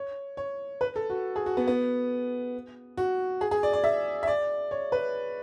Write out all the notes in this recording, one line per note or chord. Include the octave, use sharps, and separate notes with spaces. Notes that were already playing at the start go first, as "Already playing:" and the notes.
Already playing: C#5
C#5
B4
A4
F#4
G#4
F#4
B3
B3
F#4
G#4
G#4
D5
D5
E5
E5
D5
C#5
B4